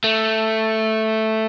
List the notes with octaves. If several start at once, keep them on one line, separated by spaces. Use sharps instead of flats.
A3